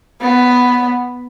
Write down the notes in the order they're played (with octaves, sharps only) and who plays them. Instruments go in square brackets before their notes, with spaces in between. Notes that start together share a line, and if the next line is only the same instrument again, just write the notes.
[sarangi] B3